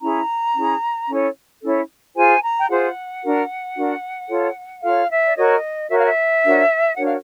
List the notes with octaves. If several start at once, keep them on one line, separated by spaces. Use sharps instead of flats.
C#4 E4 G#4 A#5
C#4 E4 G#4
C#4 E4 A4 C#5
C#4 E4 A4 C#5
F4 G#4 C5 G#5
A#5
G5
F4 G#4 C5 F#5
D4 F#4 A#4
D4 F#4 A#4
F4 A4 C#5
F4 A4 C#5 F5
E5
D5
F#4 A#4 C#5 D#5
F#4 A#4 C#5 E5
F5
E5
D4 F#4 A#4 C#5
D4 F#4 A#4 C#5 F#5
F5